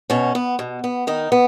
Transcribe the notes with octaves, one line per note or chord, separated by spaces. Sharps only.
B2 C#4
B3
B2
B3
D#3 D#4
B3